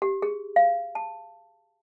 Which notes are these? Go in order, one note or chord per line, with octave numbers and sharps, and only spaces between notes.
G4
G#4
F5
A5